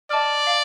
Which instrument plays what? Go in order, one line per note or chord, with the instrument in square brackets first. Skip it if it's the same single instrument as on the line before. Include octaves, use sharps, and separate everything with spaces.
[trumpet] D5 [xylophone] D#5 A5 D6 F6
[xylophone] F5